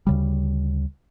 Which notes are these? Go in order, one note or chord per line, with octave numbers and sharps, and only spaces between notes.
D2 C#3 G3